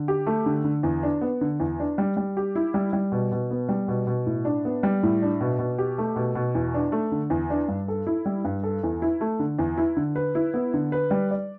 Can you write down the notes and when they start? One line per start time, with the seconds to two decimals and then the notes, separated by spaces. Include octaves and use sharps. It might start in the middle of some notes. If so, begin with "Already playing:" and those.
Already playing: D3
0.08 G4
0.27 A3
0.46 D3
0.64 D3
0.83 E2
1.03 D4
1.21 B3
1.41 D3
1.60 E2
1.80 D4
1.98 G3
2.17 G3
2.37 G4
2.55 E4
2.74 G3
2.93 G3
3.12 B2
3.32 B2
3.51 B3
3.69 G3
3.88 B2
4.07 B2
4.26 A2
4.45 D4
4.65 B3
4.83 G3
5.03 A2
5.22 D4
5.41 B2
5.59 B2
5.78 G4
5.98 A3
6.16 B2
6.35 B2
6.55 E2
6.74 D4
6.92 A3
7.12 D3
7.30 E2
7.50 D4
7.68 G2
7.88 A4
8.07 E4
8.26 G3
8.44 G2
8.63 A4
8.83 E2
9.02 E4
9.21 A3
9.39 D3
9.59 E2
9.77 E4
9.97 D3
10.16 B4
10.35 E4
10.54 B3
10.74 D3
10.92 B4
11.11 G3
11.31 D5